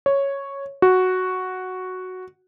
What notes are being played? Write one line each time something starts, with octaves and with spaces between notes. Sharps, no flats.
C#5
F#4